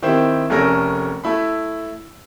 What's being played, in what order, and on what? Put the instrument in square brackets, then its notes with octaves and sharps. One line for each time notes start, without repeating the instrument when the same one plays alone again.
[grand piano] D#3 C4 E4 G4 C5
F1 A3 C#4 A#4 A#6
A3 E4 B5